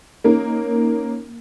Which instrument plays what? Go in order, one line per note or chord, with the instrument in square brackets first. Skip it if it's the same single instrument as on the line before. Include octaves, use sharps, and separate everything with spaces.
[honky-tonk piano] A#3 C#4 D#4 A#4